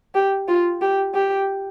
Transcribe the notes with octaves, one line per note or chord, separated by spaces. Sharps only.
G4
F4
G4
G4